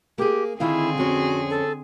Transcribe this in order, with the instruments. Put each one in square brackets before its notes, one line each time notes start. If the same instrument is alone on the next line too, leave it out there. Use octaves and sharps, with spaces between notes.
[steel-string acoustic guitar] A#3 G#4 [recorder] G4
[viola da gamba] D3 C4 G#4 [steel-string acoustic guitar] D#3 F4 F5 [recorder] E4
[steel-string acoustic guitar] F2 C#4 [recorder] F#4
[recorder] A4